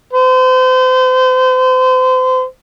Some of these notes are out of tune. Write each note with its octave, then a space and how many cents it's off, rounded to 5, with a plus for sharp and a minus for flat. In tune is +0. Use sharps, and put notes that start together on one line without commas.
C5 -35